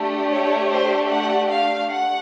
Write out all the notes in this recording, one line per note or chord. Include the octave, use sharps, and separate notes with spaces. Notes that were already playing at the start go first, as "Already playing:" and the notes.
Already playing: A3 D4 G4
C#5
C5
F#5
F5
F#5